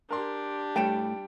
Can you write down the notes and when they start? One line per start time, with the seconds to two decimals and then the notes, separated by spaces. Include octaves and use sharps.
0.10 D4 G4 A#4 C6
0.76 A2 G3 A3 G5 D7 E7